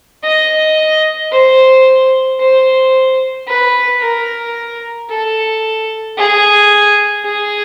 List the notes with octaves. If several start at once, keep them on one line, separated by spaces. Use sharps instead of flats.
D#5
C5
C5
B4
A#4
A4
G#4
G#4